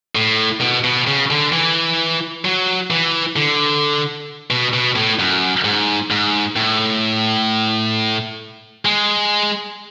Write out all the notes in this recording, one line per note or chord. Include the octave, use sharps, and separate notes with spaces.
A2
B2
B2
C#3
D3
E3
F#3
E3
D3
B2
B2
A2
F#2
G#2
G#2
A2
G#3